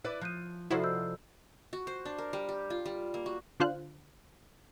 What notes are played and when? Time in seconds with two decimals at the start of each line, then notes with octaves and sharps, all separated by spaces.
0.04 E4 B4 D5
0.21 F3 F#6 G6 D#7
0.71 C3 F3 E4 F#4 A4 C5 D5 B5
0.84 D#5 E6 G6
1.73 F#4
1.87 C5
2.05 D4
2.18 A#4
2.33 G3
2.49 G4
2.70 F4
2.86 G3
3.14 A#3
3.26 F#4
3.60 D3 D4 F4 C5 F5 F#6